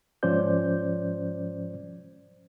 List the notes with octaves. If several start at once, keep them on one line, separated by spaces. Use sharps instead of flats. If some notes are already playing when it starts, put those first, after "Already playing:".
G#2 F3 C#4 C5 D5 G6